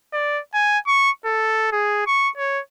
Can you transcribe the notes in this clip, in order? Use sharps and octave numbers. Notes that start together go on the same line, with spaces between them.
D5
G#5
C#6
A4
G#4
C#6
C#5